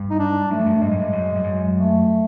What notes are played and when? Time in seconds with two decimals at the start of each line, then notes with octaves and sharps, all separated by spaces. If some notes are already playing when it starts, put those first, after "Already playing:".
Already playing: G2
0.10 D#4
0.19 D4
0.51 F#2 A3
0.59 F2
0.66 F#2
0.81 G2 G#3
0.91 G#2
0.99 G2
1.13 F#2
1.35 G2
1.44 F#2
1.76 A3